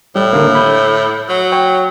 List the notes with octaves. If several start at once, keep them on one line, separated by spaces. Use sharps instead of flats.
A2 G3
D3 A#3
B5 G6
F#3
C#5 G5